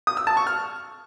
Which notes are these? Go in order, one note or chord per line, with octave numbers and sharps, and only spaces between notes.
D#6
E6
A5
C#6
F6